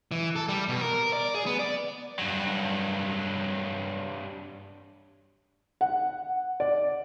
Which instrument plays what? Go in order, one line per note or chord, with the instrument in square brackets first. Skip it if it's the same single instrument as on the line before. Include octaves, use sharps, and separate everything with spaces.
[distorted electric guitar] E3
A4
G3
B2
A#4
D5
G#4
B3
D5
[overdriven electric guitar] G2 F#3
[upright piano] F#5
D5